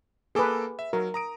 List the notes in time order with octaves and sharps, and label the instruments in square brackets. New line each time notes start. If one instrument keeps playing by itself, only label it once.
[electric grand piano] A#3 A4 D6 [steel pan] G#4 B4
[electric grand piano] E5
[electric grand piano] F#3 [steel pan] A#4
[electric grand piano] A#5 D#6 D7